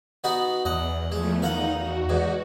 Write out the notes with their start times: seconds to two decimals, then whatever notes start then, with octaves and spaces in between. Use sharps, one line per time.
0.24 B3 D#4 F#4
0.65 E2 D#5 F#5
1.12 F3 G#3 A3
1.42 D#4 A#4 F5 F#5
1.78 F#4
2.09 E2 G#2